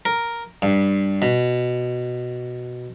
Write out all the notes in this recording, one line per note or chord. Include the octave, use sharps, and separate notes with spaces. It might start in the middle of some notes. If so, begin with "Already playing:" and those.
A#4
G2
B2